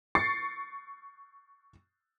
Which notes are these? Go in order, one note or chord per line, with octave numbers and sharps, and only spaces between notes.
C#6 A6 C7 C#7